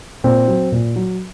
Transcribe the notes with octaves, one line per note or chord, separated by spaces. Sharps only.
A#2 C4
F#3
A#2
F#3